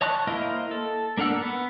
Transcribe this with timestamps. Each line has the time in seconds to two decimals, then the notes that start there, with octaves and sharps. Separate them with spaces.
0.01 C#5 D#5 A5 C#6 F#6
0.27 A#3 E4 C5 D#5 F5
0.71 A4
1.17 A#3 D4 A#4 F#5 E6
1.42 B3